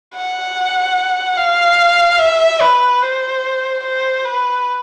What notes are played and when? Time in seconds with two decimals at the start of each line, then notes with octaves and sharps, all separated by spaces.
0.15 F#5
1.38 F5
2.19 E5
2.61 B4
3.02 C5
3.84 C5
4.25 B4